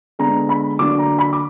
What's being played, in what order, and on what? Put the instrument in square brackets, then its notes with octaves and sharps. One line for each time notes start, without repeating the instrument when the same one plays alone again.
[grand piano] D3 G#3 B3 D4 A#5
B5
D3 F#3 A#3 D4 D6
A#5
B5
D6